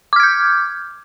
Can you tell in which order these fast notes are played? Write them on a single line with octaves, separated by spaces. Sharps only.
D6 F6 G#6 G6